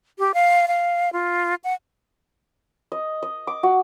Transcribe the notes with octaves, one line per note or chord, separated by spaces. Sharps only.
G4
F5
F5
F4
F#5
D#5
D#5
D6
F#4